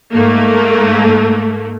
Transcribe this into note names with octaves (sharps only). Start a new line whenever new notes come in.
G#2 A3 A#3